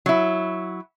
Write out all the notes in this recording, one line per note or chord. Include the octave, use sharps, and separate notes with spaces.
F#3 E4